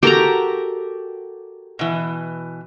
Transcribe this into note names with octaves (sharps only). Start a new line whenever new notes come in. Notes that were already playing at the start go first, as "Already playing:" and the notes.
F#4 G4 A4 A#4 A#5
B2 E3